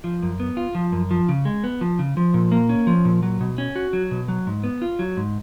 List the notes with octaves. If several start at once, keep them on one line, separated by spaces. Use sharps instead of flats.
F3
F#2
B3
F4
F3
F#2
F3
C#3
G#3
B3
F3
C#3
F3
A#2
A#3
C#4
F3
A#2
F#3
B2
C#4
F#4
F#3
B2
F#3
G#2
B3
F4
F#3
G#2